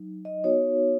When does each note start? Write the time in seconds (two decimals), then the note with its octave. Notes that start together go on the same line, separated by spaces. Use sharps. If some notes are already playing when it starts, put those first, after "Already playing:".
Already playing: F#3 D#4
0.25 D#5
0.44 B3 D#4 F#4 C#5